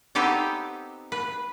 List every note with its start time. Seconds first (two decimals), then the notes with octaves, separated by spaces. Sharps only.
0.15 B3 C4 D#4 G4 A4
1.12 B4